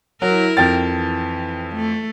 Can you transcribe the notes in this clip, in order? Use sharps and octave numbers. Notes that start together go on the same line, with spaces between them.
F#3 E4 A#4
F2 G5 A6
E3
A3